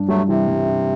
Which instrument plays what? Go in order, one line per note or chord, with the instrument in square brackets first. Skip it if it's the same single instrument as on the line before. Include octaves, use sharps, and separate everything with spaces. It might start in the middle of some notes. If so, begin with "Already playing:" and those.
Already playing: [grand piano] G2 D4
[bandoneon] F#3 A3 [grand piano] G3
[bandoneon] C3 [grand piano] E3
[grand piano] G2
D4